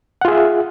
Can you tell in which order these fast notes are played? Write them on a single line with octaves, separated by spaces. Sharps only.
F#5 F4 G#4 E5